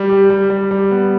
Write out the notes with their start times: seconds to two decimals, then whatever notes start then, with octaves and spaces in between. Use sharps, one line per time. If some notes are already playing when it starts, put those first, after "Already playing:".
Already playing: G3
0.10 G4
0.30 G3
0.50 G3
0.71 G3
0.91 B3